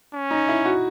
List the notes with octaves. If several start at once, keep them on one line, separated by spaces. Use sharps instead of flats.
C#4
D#4
E4
F#4